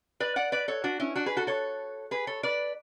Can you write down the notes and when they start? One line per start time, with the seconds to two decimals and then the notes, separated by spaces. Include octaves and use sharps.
0.20 B4 D5
0.36 D5 F#5
0.52 B4 D5
0.68 A4 C#5
0.84 D4 F#4
1.00 C#4 E4
1.15 D4 F#4
1.26 G#4 B4
1.37 F#4 A4
1.47 A4 C#5
2.11 G#4 B4
2.27 A4 C#5
2.43 B4 D5